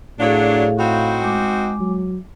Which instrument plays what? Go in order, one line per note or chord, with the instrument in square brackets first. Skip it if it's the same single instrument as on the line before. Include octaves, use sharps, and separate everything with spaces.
[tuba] A2 [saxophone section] F#3 D4 [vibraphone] G#4 F5
[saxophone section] C4 D#4 F#4 [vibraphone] F5 B5
[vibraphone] G#3 D6
[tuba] F#3